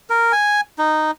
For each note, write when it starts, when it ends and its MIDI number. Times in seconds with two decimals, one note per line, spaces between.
0.10 0.32 70
0.32 0.61 80
0.79 1.11 63